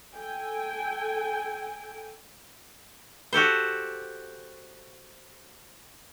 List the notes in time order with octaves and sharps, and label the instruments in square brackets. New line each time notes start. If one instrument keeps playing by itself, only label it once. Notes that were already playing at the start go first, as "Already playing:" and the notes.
[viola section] A4 G5 G#5
[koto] F#4 G4 A4 C5